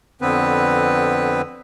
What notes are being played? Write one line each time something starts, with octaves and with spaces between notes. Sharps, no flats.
F2 D3 B3 C4 B4